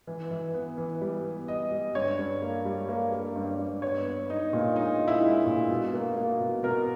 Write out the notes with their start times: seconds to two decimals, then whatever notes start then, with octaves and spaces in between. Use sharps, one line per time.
0.07 E3
0.31 E3
0.54 B3
0.78 E3
1.01 G3
1.25 B3
1.48 B3 D#5
1.71 G3
1.95 G2 C#5
2.19 G2
2.42 A#3
2.65 G3
2.89 A#3
3.12 A#3
3.36 G2
3.59 G2
3.82 B3 C#5
4.07 B3
4.30 B3 D#4
4.53 A#2
4.76 G#3 D#4
5.00 A#2
5.08 E4
5.23 G#3
5.46 A#2
5.70 B2
5.94 A#3
6.17 A#3
6.40 B2
6.63 B2 A#4